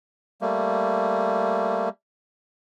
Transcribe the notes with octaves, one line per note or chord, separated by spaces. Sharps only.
G3 A3 A#3